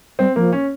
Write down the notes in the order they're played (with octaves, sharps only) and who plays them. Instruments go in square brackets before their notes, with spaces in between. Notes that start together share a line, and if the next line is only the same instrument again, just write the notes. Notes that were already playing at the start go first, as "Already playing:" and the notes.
[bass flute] G3 [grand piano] C4
[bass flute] F3 [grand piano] A#3
[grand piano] C#4